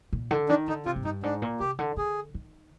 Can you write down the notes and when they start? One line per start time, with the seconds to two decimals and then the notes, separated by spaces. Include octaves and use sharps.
0.13 A#2
0.31 D3
0.49 D#3 D4
0.68 D3 D#4
0.86 C3 F4
0.96 G#2
1.05 G2 D#4
1.23 G#2 D4
1.42 A#2
1.60 C3 G4
1.79 D3
1.97 D3 G#4
2.34 D#3